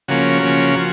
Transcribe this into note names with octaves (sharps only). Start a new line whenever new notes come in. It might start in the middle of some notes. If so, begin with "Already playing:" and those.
C#3 F3 A#3 C#4 F#4
C#3 F3 A#3 C#4
F3